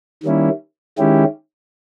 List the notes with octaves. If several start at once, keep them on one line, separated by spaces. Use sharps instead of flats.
D#3 G3 A#3 C#4 E4
D#3 G#3 C#4 E4 G4